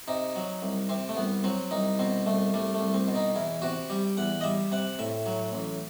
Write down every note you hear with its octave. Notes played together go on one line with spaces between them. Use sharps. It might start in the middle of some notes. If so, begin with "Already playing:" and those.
C3 D#4
F#3
C2
C3 C4
A3
C2 B3
F#3 C4
C2 D#4
B2 C4
C2 A3
G3 A3
A3
C2
C4
B2
D#4
E2 E4
C3 F#4
G3 G4
E2 F#5
D#5
G3 E5
C3 F#5
A2 E5
F#3
A1